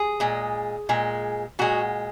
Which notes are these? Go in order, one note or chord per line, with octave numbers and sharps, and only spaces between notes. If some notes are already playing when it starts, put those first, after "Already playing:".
Already playing: G#4
A#2 G#3
A#2 G#3
A#2 G#3 F#4